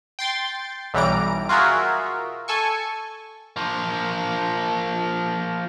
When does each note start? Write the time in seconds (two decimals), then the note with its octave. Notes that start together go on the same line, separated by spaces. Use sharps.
0.19 G5 C6 A6
0.94 B1 E3 G3 A#5 D7
1.49 F4 F#4 G#4 A#4 E5
2.48 A4 G#5 C#6
3.56 F3 A#3